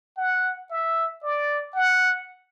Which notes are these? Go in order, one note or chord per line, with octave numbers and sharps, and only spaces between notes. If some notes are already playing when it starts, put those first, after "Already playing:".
F#5
E5
D5
F#5